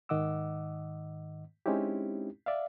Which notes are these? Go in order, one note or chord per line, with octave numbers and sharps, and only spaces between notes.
G#2 D#3 D#5 F#5 D6 E6
G#3 C4 C#4 D#4 E4 G4
D5 E5 F5